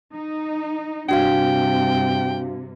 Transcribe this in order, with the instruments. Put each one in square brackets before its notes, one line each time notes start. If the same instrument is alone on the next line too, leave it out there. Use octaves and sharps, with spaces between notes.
[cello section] D#4
[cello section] G2 C3 [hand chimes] D4 F#4 F5 [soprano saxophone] G5